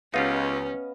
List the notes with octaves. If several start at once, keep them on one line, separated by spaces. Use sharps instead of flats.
C#2 B3 C#4 D#4 F4 G4 D#5 F5